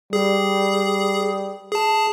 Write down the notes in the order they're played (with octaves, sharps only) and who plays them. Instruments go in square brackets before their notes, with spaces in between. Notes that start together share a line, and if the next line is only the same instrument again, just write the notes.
[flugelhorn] G3 [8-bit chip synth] G#4
[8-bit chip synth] G#4 A5